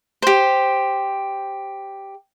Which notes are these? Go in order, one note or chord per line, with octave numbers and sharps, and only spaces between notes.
G4 C5